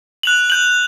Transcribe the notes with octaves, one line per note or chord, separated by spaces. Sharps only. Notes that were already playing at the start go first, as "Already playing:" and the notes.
F#6 F7 F#7
G6 F#7